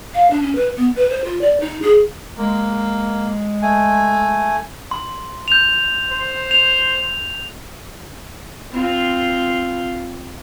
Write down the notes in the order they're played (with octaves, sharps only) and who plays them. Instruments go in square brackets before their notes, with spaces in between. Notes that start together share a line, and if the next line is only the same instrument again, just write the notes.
[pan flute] F5
D4
C#4
B4
B3
B4
C5
F4
D5
D#4
G#4
[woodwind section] G#3 [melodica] A#3
[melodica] A3 G#5
[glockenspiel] C6
G6 F7
[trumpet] C5
[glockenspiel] F7
[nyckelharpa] C4 F4